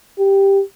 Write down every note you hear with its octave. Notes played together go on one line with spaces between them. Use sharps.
G4